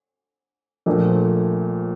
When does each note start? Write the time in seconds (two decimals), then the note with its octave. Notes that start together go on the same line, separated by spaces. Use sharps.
0.86 A#1 A#2 F3 A3